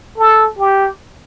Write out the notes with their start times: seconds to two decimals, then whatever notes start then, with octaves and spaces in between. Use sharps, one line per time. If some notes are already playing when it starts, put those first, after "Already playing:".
0.18 A4
0.59 G4